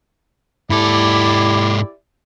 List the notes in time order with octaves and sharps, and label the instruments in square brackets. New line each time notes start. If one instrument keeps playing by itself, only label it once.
[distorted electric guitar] G#2 A4 [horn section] E4 G4 D5